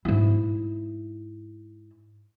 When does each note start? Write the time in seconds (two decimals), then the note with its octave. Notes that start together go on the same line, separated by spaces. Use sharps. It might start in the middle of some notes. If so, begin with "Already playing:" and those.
0.05 G#2 E4